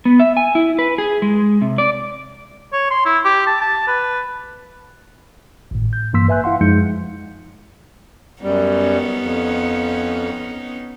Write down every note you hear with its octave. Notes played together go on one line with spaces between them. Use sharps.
B3
E5
G#5
E4
B4
G#4
G#3
C3
D5
C#5
C6
E4
G4
A5
A5
B4
G#1 A2
G6
G2 E3 A#3 C6 E6 B6
B4 E5 G#5 F#6 G6
E4 F5 F#5 C6
F#2 F3 G#3 D#4 G6 C#7
F#2 G3 B3 C#4 D#4
F2